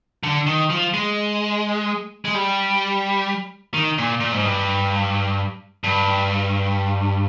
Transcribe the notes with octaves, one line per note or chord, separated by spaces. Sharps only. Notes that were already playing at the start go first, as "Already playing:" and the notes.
D3
D#3
F3
G#3
G#3
G3
D#3
A#2
A#2
G#2
G2
G2